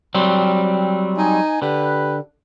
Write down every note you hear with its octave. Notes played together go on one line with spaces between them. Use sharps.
F#3 G3 C4
D#4 G#5
D3 G4 B4